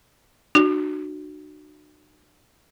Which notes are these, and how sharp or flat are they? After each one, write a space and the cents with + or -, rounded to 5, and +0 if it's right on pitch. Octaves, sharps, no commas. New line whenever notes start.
D4 +45 F#4 +0